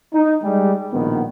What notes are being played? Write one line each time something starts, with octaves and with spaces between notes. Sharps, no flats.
D#4
G3 G#3
A#1 B2 D#3 B3